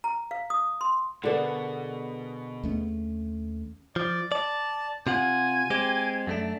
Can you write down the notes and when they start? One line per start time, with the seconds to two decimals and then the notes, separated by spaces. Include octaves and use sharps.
0.04 A#5
0.31 F5
0.50 D#6
0.81 C6
1.23 B2 D3 D4 G#4 A#4 B4
2.63 D#2 A3 C#4
3.96 F3 D5
4.32 D5 A5
5.07 C3 F4 F#5 G#5
5.70 G#3 C4 G4
6.27 F#2 A3 D4